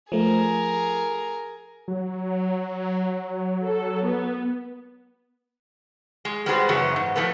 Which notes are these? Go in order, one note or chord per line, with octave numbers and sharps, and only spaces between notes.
F3 A3 G#4 A#4
F#3
A4
B3
G#3
G3 G#3 B3 F#4 G#4 C5
F#2 C#3 E3 B3 F#4
G#2
B2 E3 F3 A3 B3